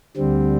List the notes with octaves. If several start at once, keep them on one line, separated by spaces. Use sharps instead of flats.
D2 D3 G3 C4